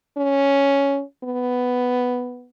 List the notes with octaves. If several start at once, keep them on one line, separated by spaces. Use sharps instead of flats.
C#4
B3